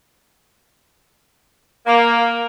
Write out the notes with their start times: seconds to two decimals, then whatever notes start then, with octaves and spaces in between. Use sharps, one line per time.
1.86 A#3